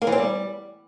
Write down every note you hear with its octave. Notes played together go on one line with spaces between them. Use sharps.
A#3
E3
C4
G3